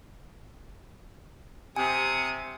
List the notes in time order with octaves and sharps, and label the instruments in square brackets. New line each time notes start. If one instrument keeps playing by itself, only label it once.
[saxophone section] C3 [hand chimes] G#5 [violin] D#6 C#7